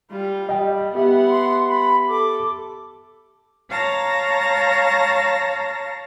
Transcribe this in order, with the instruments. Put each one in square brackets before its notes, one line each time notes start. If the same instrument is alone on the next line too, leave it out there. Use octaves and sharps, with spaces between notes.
[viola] G3 F4
[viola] G3 [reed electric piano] D#5 G5
[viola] B3 F#5 [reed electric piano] G4 E5
[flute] C6
B5
[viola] A4 [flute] D6
[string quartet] C#5 F5 A5 A#5 A#6